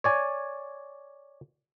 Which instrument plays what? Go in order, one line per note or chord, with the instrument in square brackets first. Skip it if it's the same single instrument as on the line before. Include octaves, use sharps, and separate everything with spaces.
[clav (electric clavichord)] C#5 D5 G#5